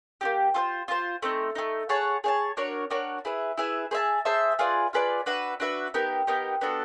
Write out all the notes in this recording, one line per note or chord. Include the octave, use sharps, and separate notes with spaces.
A#3 D#4 G4
F4 A4 C5
F4 A4 C5
A3 C4 D#4
A3 C4 D#4
G#4 C#5 F#5 A5
G#4 C#5 F#5 A5
D4 F#4 A#4 C#5
D4 F#4 A#4 C#5
E4 G#4 B4 E5
E4 G#4 B4 E5
G#4 C5 E5 A5
G#4 C5 E5 A5
F4 G#4 B4 D5
F4 G#4 B4 D5
D4 F#4 B4 E5
D4 F#4 B4 E5
B3 D#4 G4 A#4
B3 D#4 G4 A#4
B3 D4 F#4 A4